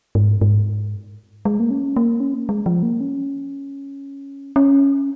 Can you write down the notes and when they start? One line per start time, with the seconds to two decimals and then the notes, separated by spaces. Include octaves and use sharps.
0.15 G#2
0.41 G#2
1.45 G#3
1.60 A#3
1.71 C#4
1.96 A#3
2.20 C#4
2.34 A#3
2.49 G#3
2.66 F3
2.83 A#3
3.00 C#4
4.56 C#4